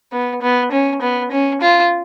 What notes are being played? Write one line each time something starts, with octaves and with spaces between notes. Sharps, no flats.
B3
B3
C#4
B3
C#4
F4